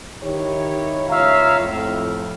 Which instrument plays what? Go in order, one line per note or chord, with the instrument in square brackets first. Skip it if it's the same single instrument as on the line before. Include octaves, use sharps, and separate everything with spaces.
[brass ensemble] D#3 D#4 E4 G4 C#5
C#2 F4 C#5 E5 F5 A#5
F2 A2